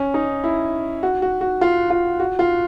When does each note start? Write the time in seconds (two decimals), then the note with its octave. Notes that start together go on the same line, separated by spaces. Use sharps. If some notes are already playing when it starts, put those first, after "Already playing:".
Already playing: C#4
0.14 D#4
0.44 E4
1.03 F#4
1.22 F#4
1.41 F#4
1.61 F4
1.90 F4
2.20 F#4
2.39 F4